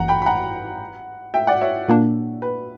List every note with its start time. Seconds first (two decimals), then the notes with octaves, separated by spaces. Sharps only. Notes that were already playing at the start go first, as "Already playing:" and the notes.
Already playing: G1 F#2 E3 A#3 F#5 A#5
0.08 G5 B5
0.22 B5
0.26 F#5 A#5
1.34 E5 G5
1.47 D5 F#5
1.61 C#5 E5
1.89 A#2 A#3 D4
2.42 B4